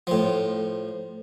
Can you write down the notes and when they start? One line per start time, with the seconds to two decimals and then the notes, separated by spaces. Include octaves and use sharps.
0.07 A2 F3